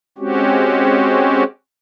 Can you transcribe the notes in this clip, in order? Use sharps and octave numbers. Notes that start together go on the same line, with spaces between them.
G#3 C4 C#4 F#4 G4